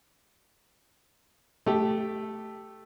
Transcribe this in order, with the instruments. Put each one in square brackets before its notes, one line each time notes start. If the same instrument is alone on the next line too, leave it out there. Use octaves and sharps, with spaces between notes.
[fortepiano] A3 G4